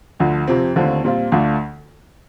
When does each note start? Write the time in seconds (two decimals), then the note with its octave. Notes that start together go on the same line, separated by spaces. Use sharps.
0.20 D2 D3 F3
0.48 F2 C3 F3 C4
0.76 D#2 D3 A3 C4 F4
1.04 A#2 G3 C4 F4
1.32 D2 D3 A3 D4 F4